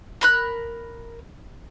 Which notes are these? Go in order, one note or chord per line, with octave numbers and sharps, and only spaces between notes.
A#4 B5 F#6